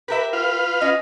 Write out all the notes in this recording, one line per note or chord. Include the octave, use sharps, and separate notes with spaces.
G4 A#4 B4 E5
F4 B4 F5
C#4 D#5